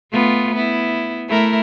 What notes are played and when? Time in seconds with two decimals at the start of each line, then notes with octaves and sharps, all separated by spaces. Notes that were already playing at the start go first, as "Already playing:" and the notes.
0.11 A3 B3 F4
0.55 B3 E4
1.28 A3 E4 A#4